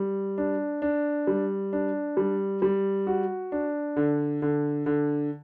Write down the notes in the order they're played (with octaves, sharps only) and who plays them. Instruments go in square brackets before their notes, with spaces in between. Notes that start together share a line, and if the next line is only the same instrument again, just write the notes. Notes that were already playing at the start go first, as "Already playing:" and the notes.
Already playing: [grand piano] G3
D4
D4
G3
D4
G3
G3
F#4
D4
D3
D3
D3